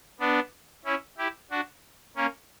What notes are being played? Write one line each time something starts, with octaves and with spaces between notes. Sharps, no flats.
B3 D4
C#4 E4
E4 G4
D4 F#4
A#3 C#4